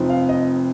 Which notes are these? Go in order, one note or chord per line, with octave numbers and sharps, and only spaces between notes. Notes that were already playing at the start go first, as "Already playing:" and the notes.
Already playing: F1 F2 F3 D#4
F5
D#5